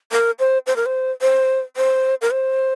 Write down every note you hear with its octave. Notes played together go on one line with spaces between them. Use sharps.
A#4
C5
C5
A#4
C5
C5
C5
A#4
C5